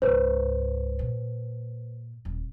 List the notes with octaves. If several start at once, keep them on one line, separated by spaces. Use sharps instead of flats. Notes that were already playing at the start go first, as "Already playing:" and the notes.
C#2 G#2 B4 C5
A#2
D#1